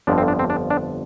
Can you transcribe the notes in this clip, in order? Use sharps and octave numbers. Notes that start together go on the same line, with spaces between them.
G1 F2 D3 F3 D4
C4
D4
C4
D4
D4